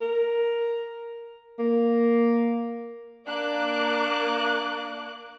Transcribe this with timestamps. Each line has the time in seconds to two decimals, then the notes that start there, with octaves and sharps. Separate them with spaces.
0.01 A#4
1.59 A#3
3.27 A#3 D4 D6 F#6